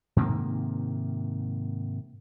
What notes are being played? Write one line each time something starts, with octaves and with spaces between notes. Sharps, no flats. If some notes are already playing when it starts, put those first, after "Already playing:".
G#2 C3 D#3 A#3